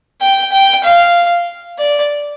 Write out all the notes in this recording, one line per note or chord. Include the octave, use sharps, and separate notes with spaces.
G5
G5
F5
D5